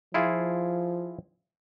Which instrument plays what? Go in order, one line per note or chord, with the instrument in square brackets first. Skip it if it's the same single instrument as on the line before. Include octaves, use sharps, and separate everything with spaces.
[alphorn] F3 [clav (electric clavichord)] E4 F4 G#4